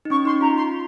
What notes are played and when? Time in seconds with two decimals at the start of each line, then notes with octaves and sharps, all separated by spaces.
0.05 D#4
0.10 C#4 C#6
0.25 D#4 C6
0.41 F4 A#5
0.57 C6
0.72 F4